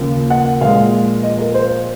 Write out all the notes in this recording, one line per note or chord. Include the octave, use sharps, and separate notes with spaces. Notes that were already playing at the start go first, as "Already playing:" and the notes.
Already playing: D#2 C#3 F3 A#3
F#5
A#2 F3 G#3 F5
D#5
A#4
C5